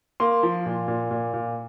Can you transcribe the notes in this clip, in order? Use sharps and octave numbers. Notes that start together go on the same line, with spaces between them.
A#3 C6
F3
A#2
A#2
A#2
A#2